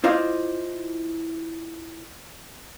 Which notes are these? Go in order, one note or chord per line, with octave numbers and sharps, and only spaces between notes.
E4 F4 C5 D5 D#5 F5